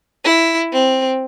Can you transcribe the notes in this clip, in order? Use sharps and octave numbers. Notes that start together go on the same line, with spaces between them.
E4
C4